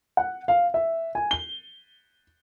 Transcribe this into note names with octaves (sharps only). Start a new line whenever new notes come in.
F#5
F5
E5
G#5
G7